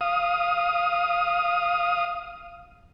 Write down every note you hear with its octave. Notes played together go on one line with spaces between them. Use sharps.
F5 D#6